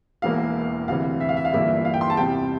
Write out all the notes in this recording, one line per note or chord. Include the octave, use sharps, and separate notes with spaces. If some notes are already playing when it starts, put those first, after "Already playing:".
E1 E2 E3 A#3 F5
D2 C3 E3 F5
E5
F5
E5
F5
G1 G2 E3 A#3 E5
F5
G5
C6
A5
E2 C3 G3 G5